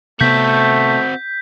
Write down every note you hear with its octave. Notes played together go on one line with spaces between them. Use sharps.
C3 A3 B3 C4 F#4 G6 B6